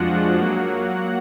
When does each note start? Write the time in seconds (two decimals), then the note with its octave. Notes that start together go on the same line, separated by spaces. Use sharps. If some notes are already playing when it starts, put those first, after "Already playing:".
Already playing: F2 F3 G#3 D4 F4 F#4 F#5
0.39 F#3 A#3